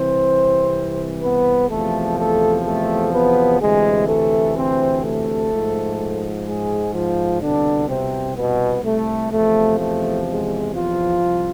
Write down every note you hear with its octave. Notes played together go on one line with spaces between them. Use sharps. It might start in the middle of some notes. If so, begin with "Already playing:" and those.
Already playing: C2 C3 E3 C4 C5
B3 B4
E2 C3 F3 A3 A4
A3 A4
A3 A4
B3 B4
D2 C3 E3 G#3 G#4
A3 A4
C4 C5
A3 A4
G#2 F3
G#3 G#4
F3 F4
C2 B2 D3 D4
C3 C4
B2 B3
A3
E2 C3 F3 A3
A3
G#3
F3 F4
C2